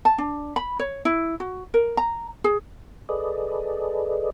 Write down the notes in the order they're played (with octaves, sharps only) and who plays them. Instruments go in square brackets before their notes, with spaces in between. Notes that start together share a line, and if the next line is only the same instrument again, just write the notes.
[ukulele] A5
D4
B5
C#5
E4
F#4
A#4
A#5
G#4
[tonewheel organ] G#4 A4 B4 D5 D#5